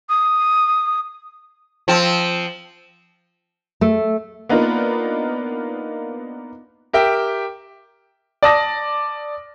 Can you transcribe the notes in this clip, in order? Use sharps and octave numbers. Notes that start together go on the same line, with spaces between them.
D#6
F3 C4
A3
A#3 B3 D4 D#4 F4 A#4
G4 A#4 E5 G5
D5 A5 D#6 A#6